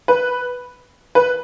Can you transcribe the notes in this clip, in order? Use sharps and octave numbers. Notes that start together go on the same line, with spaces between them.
B4
B4